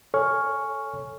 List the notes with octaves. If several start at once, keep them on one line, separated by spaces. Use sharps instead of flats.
A4 C#5 G#5 C#6 F6